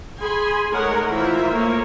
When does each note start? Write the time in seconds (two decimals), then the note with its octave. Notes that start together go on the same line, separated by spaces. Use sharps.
0.21 G#4 G#5 B5 C6
0.71 G#3 A3 D#4 A#4 C#5 F#5
1.09 E3 F4 A#4 C5 E5
1.51 A3 A#3 C#5